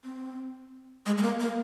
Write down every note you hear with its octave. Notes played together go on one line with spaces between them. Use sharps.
C4
G#3
G#3
A#3
A#3